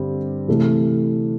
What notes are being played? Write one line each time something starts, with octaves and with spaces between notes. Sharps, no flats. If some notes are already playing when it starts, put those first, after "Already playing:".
Already playing: G2 D3 G3 C4
C3 E3 A3